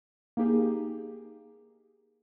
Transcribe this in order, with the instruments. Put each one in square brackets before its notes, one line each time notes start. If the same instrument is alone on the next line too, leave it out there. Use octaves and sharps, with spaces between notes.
[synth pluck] A#3 D#4 G4 G#4